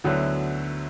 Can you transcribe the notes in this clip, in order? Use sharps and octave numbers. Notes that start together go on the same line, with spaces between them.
D2 D3 F#3 B3 E4